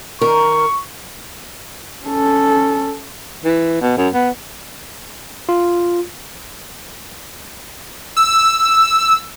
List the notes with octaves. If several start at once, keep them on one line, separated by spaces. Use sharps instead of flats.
D#3 A#4 C#6
C#4 A4
E3
B2
F#2
B3
F4
E6